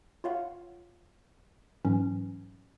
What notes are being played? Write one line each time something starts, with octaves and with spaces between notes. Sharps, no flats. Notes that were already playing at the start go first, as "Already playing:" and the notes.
F4 C#5 F5 F#5
G#2 E3 F#3 C#4